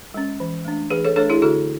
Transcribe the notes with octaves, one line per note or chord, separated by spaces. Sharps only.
G#3 C#4
E3
A3 D4
E3 G#4 B4
A4 C#5
A3 D4 A4 C#5
E4 G#4
D3 F#4 A4